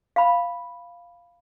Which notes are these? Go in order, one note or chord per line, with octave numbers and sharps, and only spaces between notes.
F5 B5